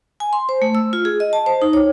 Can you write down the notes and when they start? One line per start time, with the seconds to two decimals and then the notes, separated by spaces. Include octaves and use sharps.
0.20 G#5
0.33 C6
0.49 C5
0.62 A3
0.75 E6
0.93 F4
1.05 G#4
1.20 D#5
1.33 A5
1.46 C5
1.62 D#4
1.73 C#5